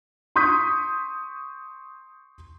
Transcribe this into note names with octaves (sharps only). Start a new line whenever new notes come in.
C6 C#6 D#6 G6 B6